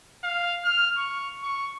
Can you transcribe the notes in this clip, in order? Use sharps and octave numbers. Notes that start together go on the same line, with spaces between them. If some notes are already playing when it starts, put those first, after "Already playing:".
F5
F6
C#6
C#6